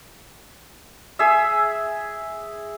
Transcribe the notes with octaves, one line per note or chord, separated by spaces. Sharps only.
G#4 E5